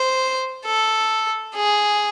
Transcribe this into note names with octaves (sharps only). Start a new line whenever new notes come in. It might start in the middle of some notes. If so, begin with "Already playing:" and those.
Already playing: C5
A4
G#4